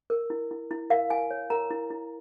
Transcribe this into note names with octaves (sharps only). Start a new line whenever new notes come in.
A#4
E4
E4
E4
A#4 F5
E4 G#5
C#5
A#4 A#5
E4
E4